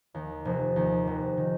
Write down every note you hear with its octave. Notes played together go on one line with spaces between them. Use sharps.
D#2
F1
D#2
F1
D#3